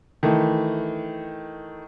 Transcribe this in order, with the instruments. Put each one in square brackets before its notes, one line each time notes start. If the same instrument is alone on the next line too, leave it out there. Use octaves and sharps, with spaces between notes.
[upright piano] D#3 E3 A3